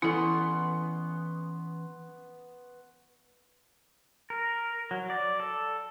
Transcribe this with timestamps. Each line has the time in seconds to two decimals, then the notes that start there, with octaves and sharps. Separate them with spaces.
0.02 E3 B3 C#4 E4 A4 G#5 C6 C#6
4.30 A#4
4.91 F#3
5.10 D5
5.40 A4